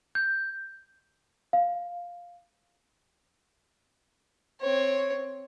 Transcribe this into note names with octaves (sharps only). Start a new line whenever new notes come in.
G6
F5
C4 C#5